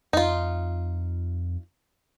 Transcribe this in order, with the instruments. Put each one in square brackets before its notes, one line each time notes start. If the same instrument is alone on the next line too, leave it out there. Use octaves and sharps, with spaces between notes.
[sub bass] F2 [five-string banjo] D#4 F4